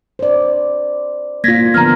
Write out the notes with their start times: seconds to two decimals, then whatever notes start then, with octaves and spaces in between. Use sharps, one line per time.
0.19 C5 D5
1.44 A#3 F4 G#6 A#6 B6
1.74 D3 F3 B3 A#5 F6